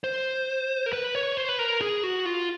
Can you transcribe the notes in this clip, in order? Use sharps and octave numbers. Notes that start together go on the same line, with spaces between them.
C5
A#4
B4
C#5
C5
B4
A#4
G#4
F#4
F4